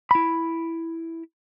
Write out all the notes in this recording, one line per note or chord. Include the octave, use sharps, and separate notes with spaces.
E4 B5